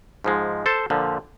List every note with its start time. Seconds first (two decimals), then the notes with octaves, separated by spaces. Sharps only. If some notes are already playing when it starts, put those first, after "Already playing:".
0.24 G#2 F3 G#3
0.66 A4 C5 A5
0.90 A#2 D3 F3